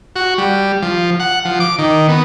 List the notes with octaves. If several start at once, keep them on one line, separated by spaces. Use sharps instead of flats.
F#4
G3
F3
F#5
F3
D6
D#3
B3